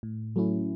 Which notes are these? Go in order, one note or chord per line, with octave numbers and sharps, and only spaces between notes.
A2
F#3 A3 C#4 E4